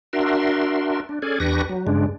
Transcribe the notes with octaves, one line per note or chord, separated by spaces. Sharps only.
D4 F#4 A#4 E5 C6
D4
C#4 G#4 A4 D5 G#5
E2 D4 G4 B4 C#6 A#6
F#3
G2 C#3 G#3 D4